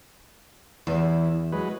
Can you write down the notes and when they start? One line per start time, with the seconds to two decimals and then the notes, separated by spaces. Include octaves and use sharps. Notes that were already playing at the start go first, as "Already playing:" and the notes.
0.87 E2 E3
1.52 F#3 G#3 B4